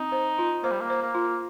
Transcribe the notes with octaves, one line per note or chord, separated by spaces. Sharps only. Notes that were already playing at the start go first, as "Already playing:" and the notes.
Already playing: C4 D#4
C5
F4
A#3 C5
G3
A#3
C5
A#3
F4